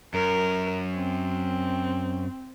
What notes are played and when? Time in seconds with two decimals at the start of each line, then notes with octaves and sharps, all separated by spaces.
0.14 F#2 A#4
0.95 C4